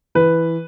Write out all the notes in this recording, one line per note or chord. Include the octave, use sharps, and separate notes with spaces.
E3 B4